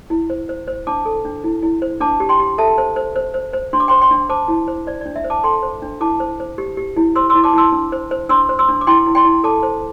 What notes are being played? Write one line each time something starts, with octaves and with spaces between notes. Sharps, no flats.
E4
C5
C5
C5
D4 A5 D6
A4
D4
E4
E4
C5
D4 A5 D6
G4
G5 C6
G4
A4 E5 A5
C5
C5
C5
C5
C5
D4 C6
D6
C5 G5 C6
G5 C6
D4
C5 A5 D6
E4
C5
C5 D5
D4 D5
E5
C5
A5 D6
A4 G5 C6
C5
D4
E4 A5 D6
C5
C5
G4
G4
E4
C5 C6 E6
C6 E6
E4
A5 D6
E4 C6 E6
D4
C5
C5
D4 C6 E6
C5
C6 E6
D4
D6
E4 G5 C6
E4
G5 C6
E4
A4 A5 D6
C5